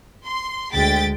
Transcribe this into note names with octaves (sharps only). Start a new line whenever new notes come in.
C6
D2 G#3 G5 A6 B6